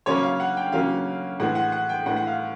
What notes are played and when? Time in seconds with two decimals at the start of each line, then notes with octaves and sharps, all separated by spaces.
0.06 C#3 F#3 A#3 C#4 C#5
0.23 F5
0.40 F#5
0.57 G5
0.72 C#3 F#3 A#3 C#4 F5
1.40 A2 E3 G#3 F#5
1.55 F#5
1.72 F#5
1.89 G5
2.06 A2 E3 G#3 F#5
2.16 F#5
2.27 F5